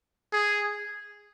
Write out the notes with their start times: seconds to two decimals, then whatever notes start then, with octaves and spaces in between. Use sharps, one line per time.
0.33 G#4